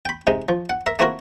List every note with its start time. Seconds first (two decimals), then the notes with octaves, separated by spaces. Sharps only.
0.05 G5 B5
0.27 C3 G#3 D#4
0.49 F3
0.70 F#5
0.86 A#4 E5
0.99 A3 A#3 C4 E4 F#4 A#4